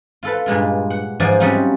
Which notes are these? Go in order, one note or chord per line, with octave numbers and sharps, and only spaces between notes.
F4 A4 B4
G2 A#2 G#3 F4
F#5
G#2 E3 F3 D5 G#5
C3 F#3 G3 C#4 D#4 F4